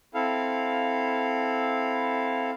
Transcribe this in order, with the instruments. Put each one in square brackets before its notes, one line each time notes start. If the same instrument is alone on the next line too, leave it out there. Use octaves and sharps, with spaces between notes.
[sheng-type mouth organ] C4 E4 A4 F5